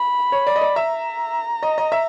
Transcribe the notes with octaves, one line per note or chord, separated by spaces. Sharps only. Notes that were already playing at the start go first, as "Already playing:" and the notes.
Already playing: B5
C#5
D5
D#5
D5
E5 A#5
D#5
D#5
E5